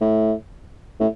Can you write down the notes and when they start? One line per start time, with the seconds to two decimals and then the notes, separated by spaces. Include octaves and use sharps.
0.01 A2
1.00 A2